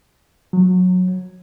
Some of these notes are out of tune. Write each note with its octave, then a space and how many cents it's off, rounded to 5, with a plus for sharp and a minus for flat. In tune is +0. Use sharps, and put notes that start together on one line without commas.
F#3 -20